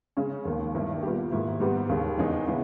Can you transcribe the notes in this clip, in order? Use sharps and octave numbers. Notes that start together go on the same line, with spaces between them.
C#3 G#3 C#4
D#2 D#3 A#3
G2 D#3 A#3 E4
A#2 G3 B3 G4
G#2 D#3 A#3 E4
G#2 G3 B3 G4
D#2 C#3 G#3
E2 C#3 G#3 D#4 G#4
C#3 G#3 B3 E4